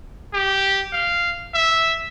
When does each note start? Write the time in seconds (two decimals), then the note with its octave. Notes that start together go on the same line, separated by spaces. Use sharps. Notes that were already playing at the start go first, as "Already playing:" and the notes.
0.34 G4
0.93 F5
1.55 E5